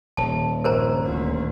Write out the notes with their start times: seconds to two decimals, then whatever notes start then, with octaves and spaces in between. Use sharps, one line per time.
0.17 D#1 A5
0.64 A#1 G2 A#4 C5 A#5
1.01 D2 A#2